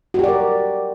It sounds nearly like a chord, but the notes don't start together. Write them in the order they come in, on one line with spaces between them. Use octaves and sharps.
F#4 G4 D5 A#4